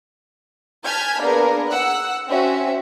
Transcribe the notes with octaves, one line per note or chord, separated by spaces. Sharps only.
G#5 A5 F6 G6 G#6 B6
A#3 B3 D4 G#4 A#4
F#5 E6 F#6
C4 C#4 F#4 E5